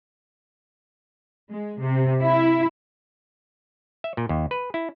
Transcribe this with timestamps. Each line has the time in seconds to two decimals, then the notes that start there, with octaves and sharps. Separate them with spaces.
1.51 G#3
1.81 C3
2.22 E4
4.04 E5
4.17 A#2
4.29 D#2
4.51 B4
4.74 E4